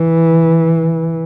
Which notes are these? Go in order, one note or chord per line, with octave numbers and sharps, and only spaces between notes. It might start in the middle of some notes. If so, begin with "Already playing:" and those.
Already playing: E3